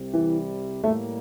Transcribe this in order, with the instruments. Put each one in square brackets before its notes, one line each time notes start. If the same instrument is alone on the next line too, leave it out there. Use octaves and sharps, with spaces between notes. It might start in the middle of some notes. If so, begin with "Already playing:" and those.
Already playing: [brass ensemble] C2 C3 G3
[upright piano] E3
[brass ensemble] A2 G3 A#3 [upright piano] A3